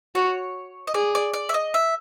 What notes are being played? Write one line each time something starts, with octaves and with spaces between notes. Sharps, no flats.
F#4 C#5
D#5
G#4 D5
D5
D5
E5
D#5
E5